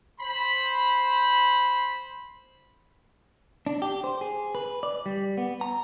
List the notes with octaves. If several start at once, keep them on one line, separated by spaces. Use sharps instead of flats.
C5 B5
D4
G4
C5
G#4
B4
D5
G3
B3
A#5